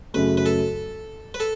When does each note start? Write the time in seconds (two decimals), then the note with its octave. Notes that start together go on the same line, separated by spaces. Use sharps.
0.14 F#2 C#3 A3 B4
0.37 B4
0.46 A4
1.34 B4
1.40 A4